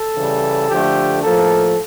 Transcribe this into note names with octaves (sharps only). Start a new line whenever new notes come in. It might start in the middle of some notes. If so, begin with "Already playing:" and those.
Already playing: A4
C#3 E3 G3
D3 F3 A3 G4
A2 F3 A#3 A4